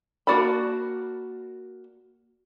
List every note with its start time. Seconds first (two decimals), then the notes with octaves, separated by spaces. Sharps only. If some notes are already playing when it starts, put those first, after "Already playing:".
0.27 A#3 F#4 D5 A5 B5